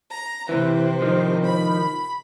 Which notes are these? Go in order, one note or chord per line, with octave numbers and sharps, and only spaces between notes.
A#5
C3 E3 C4
D#3 F3
B5